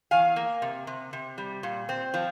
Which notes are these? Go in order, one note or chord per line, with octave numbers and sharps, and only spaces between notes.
E2 F5 G#5
A#3
C3
C3
C3
G3
A#2
C4
F3